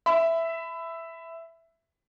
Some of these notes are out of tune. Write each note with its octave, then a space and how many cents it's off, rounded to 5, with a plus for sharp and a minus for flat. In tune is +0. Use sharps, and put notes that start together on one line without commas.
E5 +0 B5 +25